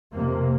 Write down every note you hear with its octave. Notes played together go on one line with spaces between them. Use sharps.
F2 C3 A#3